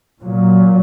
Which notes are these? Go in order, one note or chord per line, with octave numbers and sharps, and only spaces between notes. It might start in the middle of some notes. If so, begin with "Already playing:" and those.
A#2 F#3